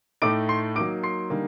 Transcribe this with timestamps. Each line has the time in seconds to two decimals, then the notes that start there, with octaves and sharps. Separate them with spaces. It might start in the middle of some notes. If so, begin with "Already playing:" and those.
0.22 A2 A3 D#4 D6 D7
0.49 C6 C7
0.76 F#3 A#3 D#4 D6 D7
1.03 C6 C7
1.30 D3 G3 A#3 D#4